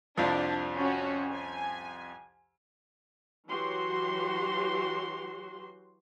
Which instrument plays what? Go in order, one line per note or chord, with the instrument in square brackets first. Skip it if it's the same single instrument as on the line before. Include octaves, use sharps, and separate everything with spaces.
[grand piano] C2 F2 F3 [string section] D4
[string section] C#4 F#4
G#5
[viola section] E3 F#3 F#4 G4 C6